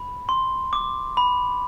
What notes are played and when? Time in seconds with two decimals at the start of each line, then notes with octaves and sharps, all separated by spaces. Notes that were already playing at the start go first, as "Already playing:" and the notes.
Already playing: B5
0.29 C6
0.73 D6
1.17 B5